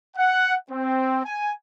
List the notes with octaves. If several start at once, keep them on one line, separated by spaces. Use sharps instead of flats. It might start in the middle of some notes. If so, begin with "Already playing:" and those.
F#5
C4
G#5